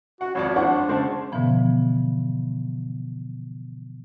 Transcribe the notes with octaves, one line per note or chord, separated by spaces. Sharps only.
F#4 F#5
G#1 F2 C#5 D5
D4 C5 F#5 C#6
C#3 G#3 C5 A5
G#2 B2 D3 E3 F3 B3